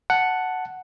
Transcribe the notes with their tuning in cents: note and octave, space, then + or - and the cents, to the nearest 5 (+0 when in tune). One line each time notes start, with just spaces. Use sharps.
F#5 +0 A5 +0